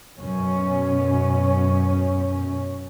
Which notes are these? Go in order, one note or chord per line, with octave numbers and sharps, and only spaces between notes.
F#2 B2 C#4